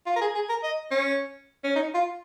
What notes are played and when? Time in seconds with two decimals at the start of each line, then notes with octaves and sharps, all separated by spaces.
0.07 F4
0.16 A#4
0.21 G#4
0.35 G#4
0.49 A#4
0.63 D#5
0.91 C#4
1.64 C#4
1.76 D#4
1.94 F4